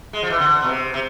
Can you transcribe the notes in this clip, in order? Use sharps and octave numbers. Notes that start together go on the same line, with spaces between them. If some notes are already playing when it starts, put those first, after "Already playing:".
G#3
F3
E3
D3
B2
C3
C3